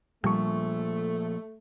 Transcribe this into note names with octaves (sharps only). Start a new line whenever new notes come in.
A#2 F3 G3 A3 C#6